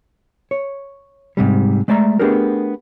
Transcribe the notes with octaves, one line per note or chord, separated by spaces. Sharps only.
C#5
G#2 C3 G3
G#3 A3 D5 E5 A#5
A3 B3 D4 G4 G#4 A#4